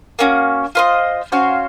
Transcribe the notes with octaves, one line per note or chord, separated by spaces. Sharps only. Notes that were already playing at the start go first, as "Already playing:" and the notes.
A#3 C#4 F#4
F4 C5 D#5
C#4 F#4 C5 F5